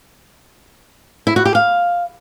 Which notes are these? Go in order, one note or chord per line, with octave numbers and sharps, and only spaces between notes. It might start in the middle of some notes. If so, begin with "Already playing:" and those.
E4
F#4
G4
F5